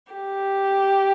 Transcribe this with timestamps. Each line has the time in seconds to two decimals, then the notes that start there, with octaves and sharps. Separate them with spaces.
0.13 G4